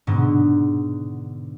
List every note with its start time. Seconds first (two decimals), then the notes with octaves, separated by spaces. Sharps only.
0.07 G#2 B2 D3